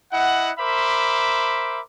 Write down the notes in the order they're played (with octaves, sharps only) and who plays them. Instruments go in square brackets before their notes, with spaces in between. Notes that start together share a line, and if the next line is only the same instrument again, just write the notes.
[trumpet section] E4 D#5 F#5
A#4 C5 E5 B5 D6